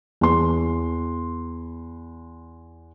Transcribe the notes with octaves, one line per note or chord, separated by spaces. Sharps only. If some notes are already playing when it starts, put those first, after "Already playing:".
E2 C6